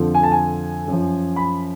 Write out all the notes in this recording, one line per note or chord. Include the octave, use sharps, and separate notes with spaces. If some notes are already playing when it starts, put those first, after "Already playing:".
Already playing: F2 D3 F3
G#5
A5
G#5
F#2 F3
B5